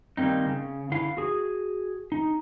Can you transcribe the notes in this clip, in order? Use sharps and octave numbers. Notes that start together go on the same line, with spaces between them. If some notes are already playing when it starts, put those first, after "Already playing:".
D#3 G3 A#3 C4 D#4
C#3
D3 E4 F5 F#5
F#4 G#4
D#4